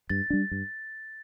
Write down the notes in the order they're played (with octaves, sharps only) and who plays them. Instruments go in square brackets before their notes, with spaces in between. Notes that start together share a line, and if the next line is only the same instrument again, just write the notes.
[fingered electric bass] G2 [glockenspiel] A6
[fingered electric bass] G3 D4
G2